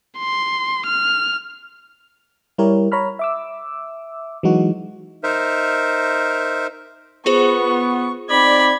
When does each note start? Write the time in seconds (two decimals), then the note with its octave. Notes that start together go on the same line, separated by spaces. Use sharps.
0.19 C6
0.86 F6
2.58 G3 E4 G4 A#4 C#5
2.92 C#5 A#5 B5 F6
3.19 E5 D6 E6
4.43 E3 F#3 G#3 D#4 F#4
5.23 D#4 A#4 C5 E5
7.26 B3 F4 G#4 C5 C#6
8.30 C4 D#4 D5 B5 G#6